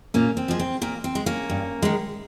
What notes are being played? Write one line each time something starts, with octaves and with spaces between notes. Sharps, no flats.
A#2 A#3 C#4
C4
F3 G#3
C4
A#2 A#3
C4
G#3
A#3 C#4
G2
D#3 G#3